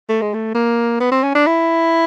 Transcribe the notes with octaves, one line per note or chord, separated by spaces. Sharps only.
A3
G#3
A3
A#3
B3
C4
C#4
D4
E4